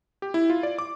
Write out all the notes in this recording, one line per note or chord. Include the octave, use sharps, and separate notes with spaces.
G4
E4
F4
D5
D6